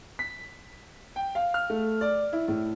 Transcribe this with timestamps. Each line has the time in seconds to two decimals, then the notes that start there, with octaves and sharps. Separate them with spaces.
0.19 B6
1.16 G5
1.35 F5
1.54 F6
1.70 A3
2.01 D5
2.33 E4
2.48 A2